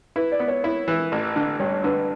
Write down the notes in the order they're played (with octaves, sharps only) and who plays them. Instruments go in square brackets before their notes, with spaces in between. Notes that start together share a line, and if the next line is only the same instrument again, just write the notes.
[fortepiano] E4 [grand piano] B4
[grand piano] D5
[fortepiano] B3
[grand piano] C#5
[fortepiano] E4 [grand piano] C#5
[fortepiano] E3 [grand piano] B4
[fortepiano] A1
D3
[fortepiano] G2 [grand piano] C#5
[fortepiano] D3 [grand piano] B4